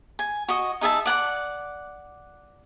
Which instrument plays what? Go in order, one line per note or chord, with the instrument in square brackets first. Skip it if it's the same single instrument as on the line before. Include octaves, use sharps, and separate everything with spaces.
[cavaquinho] G#5
F#4 D#5
D#4 G#4 E5 A5
D5 F#5 G#5 D6